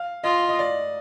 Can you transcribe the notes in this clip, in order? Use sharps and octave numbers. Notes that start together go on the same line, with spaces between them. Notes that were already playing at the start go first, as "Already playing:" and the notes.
Already playing: F5
F4 D#5
D#5
D5